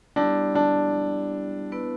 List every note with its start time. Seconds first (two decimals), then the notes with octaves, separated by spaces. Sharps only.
0.16 G3 B3 D4 E4 G4
0.55 D4
1.72 B3 E4 B4